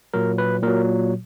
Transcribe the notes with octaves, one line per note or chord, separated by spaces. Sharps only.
A#2 F#3 A#4
B4
A#2 F#3 A#4